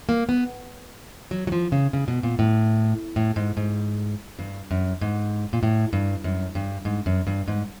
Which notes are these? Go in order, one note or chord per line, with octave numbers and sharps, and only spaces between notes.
A#3
B3
F#3
F#3
F3
C#3
C#3
B2
A#2
A2
A2
G#2
G#2
G2
F#2
G#2
A#2
A2
G2
F#2
G2
G#2
F#2
G2
G#2